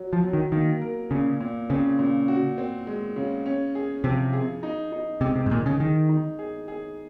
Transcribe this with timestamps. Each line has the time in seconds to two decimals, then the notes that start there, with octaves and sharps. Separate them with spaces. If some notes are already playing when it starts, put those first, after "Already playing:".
Already playing: F#3
0.13 F3
0.23 F#3
0.33 D#3
0.52 D#3 A#3
0.81 A#4
1.11 A#2 C#3
1.40 A#2
1.70 C#3 C4
1.99 A#2
2.28 F#4
2.58 C4
2.87 G#3
3.16 C#3
3.46 C#4
3.75 G#4
4.04 C3 F3
4.33 G#4
4.63 D#4
4.92 D#4
5.21 C3 G#3
5.36 C3
5.46 G#2
5.51 A#2 D#3
5.66 C#3
5.80 D#3 G#4
6.09 D#4
6.39 G#4
6.68 G#4